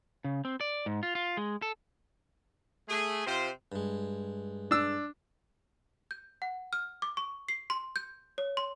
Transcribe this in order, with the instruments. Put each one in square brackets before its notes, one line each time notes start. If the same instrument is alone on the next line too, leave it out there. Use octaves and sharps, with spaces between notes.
[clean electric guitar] C#3
C4
D5
G#2
F4
F4
G#3
A4
[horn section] A3 G#4
C3 F4 C5
[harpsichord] G2 G#3
[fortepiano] D4 E6
[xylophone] G6
F#5
F6
D6
C#6
C7
C6
G6
C#5
C6